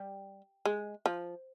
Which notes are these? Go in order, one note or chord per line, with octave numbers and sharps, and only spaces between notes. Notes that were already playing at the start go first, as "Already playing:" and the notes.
Already playing: G3
G#3
F3